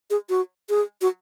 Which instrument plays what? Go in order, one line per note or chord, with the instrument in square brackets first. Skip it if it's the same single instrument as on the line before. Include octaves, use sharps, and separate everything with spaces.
[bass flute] G#4
F#4
G#4
F#4